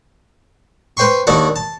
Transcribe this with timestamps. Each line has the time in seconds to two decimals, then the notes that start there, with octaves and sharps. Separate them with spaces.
0.97 B4 C5 G5 C6 C#6
1.27 D#2 D#3 D4 F#4 F#5
1.56 A5